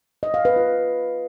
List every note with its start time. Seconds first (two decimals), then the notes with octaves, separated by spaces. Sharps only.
0.23 D#5
0.34 F5
0.45 B4
0.56 F4